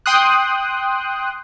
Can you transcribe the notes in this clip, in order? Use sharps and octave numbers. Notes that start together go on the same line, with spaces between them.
G5 C6 D#6 F#6